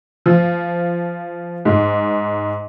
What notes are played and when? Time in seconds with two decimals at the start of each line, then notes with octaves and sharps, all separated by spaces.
0.26 F3
1.65 G#2